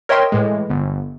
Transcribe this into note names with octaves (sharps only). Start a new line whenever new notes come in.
A#4 C#5 D#5 E5 G5 C6
A2 E3 G#3
G1